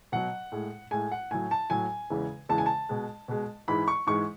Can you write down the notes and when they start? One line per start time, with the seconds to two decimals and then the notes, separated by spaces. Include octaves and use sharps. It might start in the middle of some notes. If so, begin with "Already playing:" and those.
0.12 B2 F#3 F#5
0.52 A2 G#3
0.91 A2 G#3 G#5
1.12 F#5
1.31 A2 F#3 G#5
1.51 A5
1.70 A2 F#3 G#5
2.10 E2 C#3 E3 G#3
2.49 E2 C#3 E3 G#3 A5
2.58 G#5
2.66 A5
2.89 B2 G#3
3.28 B2 G#3
3.68 G#2 E3 G#3 B5
3.88 C#6
4.07 G#2 E3 G#3 C#6